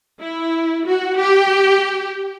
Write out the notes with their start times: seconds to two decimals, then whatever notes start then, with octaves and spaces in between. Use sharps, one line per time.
0.20 E4
0.86 F#4
1.19 G4